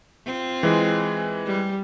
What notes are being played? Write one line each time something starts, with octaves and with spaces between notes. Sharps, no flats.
C4 F4
E3 G#3
G3